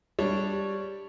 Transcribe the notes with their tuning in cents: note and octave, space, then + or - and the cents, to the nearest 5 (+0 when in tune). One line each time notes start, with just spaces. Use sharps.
G3 +0 D4 +0 C#5 +0